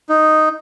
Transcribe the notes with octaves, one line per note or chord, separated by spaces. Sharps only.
D#4